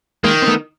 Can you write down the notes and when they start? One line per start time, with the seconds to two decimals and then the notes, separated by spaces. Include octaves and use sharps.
0.24 D#3 G#3 A#3
0.42 C4
0.48 A3 B3